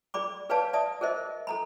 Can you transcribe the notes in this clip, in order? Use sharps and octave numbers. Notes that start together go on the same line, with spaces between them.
G#4 D5 B5 D6
G#4 B4 C#5 D5 F5 A5
D5 E5 A5 D#6
G#4 A#4 C5 D#5 E5
A4 A#5 B5